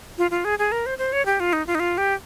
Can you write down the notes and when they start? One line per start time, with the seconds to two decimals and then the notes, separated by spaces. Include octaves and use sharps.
0.18 F4
0.31 F4
0.45 G#4
0.59 G#4
0.72 A#4
0.86 C5
0.98 C5
1.13 C#5
1.26 G4
1.40 F4
1.53 D#4
1.67 F4
1.75 D#4
1.80 F4
1.98 G4